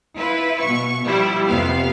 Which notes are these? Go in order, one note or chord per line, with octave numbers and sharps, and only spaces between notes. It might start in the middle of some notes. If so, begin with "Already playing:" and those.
E4 F4 B4
B2 C#6
F3 G3 E4
F2 C3 B3 F5